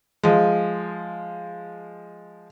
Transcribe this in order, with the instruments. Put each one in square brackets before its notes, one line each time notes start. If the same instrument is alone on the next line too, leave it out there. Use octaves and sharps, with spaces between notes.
[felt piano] F3 G#3